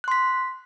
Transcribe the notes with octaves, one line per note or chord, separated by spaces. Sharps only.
C6 F#6 B6